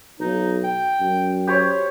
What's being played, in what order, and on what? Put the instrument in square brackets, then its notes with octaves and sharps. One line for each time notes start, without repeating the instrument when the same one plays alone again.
[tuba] B1 [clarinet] D#4
[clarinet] G5
[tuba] F#2
[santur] G4 C5 C#5